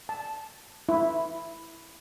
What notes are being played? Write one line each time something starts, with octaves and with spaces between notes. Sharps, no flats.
A5
E4